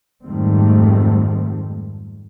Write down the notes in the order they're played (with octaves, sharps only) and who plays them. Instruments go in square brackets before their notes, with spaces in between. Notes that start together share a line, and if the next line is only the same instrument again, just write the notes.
[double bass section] F2 G#2 D#3 G3 A3 C4